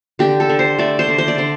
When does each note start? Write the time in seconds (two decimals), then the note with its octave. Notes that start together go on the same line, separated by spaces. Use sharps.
0.19 D3 G4
0.40 A4
0.49 D3
0.59 C5
0.78 A3 D5
0.99 C5
1.09 D3
1.18 C5
1.28 D5
1.38 D3 C5